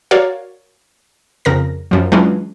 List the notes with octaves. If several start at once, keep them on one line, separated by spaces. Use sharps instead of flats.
F#4 A#4 C#5 D5 F5
F2 C#3 A#4 A#6
F#2 F3
E3 F#3 G#3 C#4 D4 F4